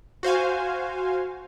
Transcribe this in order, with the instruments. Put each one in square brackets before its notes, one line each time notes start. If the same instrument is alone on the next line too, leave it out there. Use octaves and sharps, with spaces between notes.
[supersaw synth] F#4 C5 F5 G#5